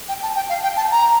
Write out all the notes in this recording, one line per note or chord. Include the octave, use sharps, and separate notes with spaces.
G5
A5
G5
F5
G5
A5
A#5